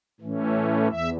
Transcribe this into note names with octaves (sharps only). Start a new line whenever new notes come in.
A2 E3 A3 C#4
E2 E5